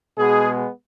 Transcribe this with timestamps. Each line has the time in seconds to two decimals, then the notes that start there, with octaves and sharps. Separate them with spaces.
0.18 B2 G#3 B3 G#4